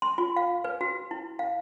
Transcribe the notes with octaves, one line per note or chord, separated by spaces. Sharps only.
C6
F4
F5
B4
F#4
E4
F5